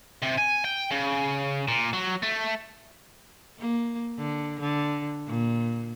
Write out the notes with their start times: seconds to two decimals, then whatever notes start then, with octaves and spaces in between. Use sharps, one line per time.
0.22 C3
0.38 G#5
0.64 G5
0.91 C#3
1.68 A#2
1.93 F#3
2.23 A3
3.59 A#3
4.18 D3
4.60 D3
5.26 A#2